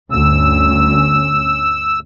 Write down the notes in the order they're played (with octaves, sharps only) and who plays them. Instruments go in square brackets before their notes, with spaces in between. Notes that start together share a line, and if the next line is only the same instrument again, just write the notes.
[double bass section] G1 D2 C#4 [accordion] E6